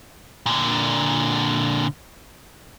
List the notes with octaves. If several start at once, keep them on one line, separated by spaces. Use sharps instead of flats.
A#2 D3